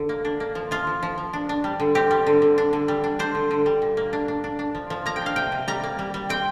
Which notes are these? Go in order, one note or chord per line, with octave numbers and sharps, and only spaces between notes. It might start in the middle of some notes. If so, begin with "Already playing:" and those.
Already playing: D3
A#3
D4
A#3
F3
F3 F4
F3
F3
F3
D4
D4
G3
D3
C4 G4
G3
D3
D3
D4
D3
G3
D4
D4 C5
D3
D3
G3
A#2
A#3
D4
D4
D4
D4
F3
F3
A#3 A#5
G5
D4 F5
C3 G5
C3
G3 A#5
A#3
G3
G3
C4 G5